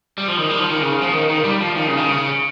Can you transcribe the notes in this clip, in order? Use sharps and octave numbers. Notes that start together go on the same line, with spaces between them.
G3
F3
D#3
G3
F3
D#3
C#3
F3
D#3
D#3
G3
F3
D#3
C#3
D#3
C#3